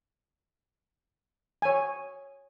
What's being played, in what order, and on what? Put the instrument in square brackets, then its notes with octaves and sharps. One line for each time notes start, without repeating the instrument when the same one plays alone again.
[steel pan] C#5 G#5